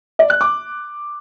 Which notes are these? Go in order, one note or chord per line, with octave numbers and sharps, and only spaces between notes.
D5
F#6
D6